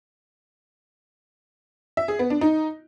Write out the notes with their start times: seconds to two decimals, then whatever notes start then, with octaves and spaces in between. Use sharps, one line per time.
1.97 E5
2.08 G#4
2.19 B3
2.30 D4
2.41 D#4